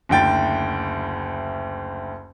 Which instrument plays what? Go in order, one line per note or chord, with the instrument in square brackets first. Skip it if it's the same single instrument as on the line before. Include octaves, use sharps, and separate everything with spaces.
[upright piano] F#1 D2 G5 A6